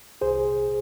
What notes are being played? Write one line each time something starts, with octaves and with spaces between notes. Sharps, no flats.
C2 G#4 C5